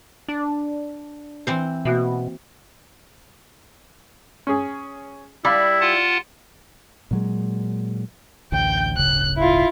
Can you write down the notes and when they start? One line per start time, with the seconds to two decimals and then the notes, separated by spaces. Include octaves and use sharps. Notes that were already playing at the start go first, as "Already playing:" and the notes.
0.28 D4
1.47 E3 C4 C5
1.85 B2 A#3 F#4 E5
4.47 C#4 G#4
5.45 G3 E4 F5 B5 D6
5.81 F4 F#5 A5
7.11 A#2 F#3 G#3
8.52 A1 D2 G5 G6
8.97 D1 G1 C#3 F#6
9.37 E4 F4